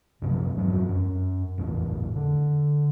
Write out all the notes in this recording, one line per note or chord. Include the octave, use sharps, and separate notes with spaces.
F#2 C3 F3
E2 G2 F#3 C4
F#2
G#1 E2 E3
D3